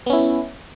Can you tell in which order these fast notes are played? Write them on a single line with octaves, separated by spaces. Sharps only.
B3 C#4 E4